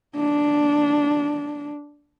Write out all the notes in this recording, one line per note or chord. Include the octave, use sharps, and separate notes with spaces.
D4